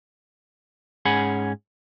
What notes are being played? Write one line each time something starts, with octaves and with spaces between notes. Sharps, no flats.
G#2 C#4 G#4 F#5 G#5 B5